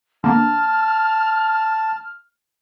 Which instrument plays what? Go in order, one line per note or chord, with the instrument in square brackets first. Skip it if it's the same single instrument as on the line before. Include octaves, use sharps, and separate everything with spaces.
[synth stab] D3 A#3 [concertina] A5 [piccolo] F6